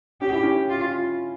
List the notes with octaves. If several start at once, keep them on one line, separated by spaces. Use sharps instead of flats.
C#4 G4
E4
C#4
F4